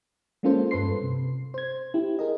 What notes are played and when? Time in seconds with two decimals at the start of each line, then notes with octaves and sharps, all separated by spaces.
0.43 G#3 A#3 C#4 F4 A4 C5
0.71 G2 A4 B4 C6 C7
1.02 C3
1.54 C5 G#6
1.94 E4 G4
2.19 G#4 A#4 D#5